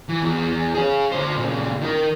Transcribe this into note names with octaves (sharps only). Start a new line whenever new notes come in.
E3
E2
G#4 C#5
D3 C5
A#2 C#3
D#3 A#4